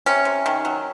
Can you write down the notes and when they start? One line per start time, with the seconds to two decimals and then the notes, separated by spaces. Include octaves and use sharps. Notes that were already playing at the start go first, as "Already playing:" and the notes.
0.06 C3 C#4
0.25 C3
0.46 D#3
0.65 F#3